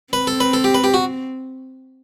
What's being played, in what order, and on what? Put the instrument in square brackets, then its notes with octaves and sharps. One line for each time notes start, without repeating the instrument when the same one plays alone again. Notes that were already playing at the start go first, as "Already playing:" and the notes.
[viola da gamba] C4 [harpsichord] B4
[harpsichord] A4
B4
A4
G4
B4
G4
F#4